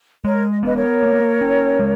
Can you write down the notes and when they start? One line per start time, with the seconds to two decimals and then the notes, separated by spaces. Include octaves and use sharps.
0.24 G#3 A#4 C#5
0.50 D#5
0.63 B3 B4 D#5
0.76 A#4 C#5
1.03 A#3
1.41 C#4
1.79 G#3